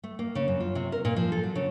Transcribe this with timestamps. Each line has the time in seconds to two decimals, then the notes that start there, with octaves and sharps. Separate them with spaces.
0.04 A3
0.19 A#3
0.35 C#3
0.48 F#2
0.60 F4
0.75 C3
0.92 A#4
1.05 A#2
1.16 F3
1.32 A4
1.44 F#3
1.55 C#3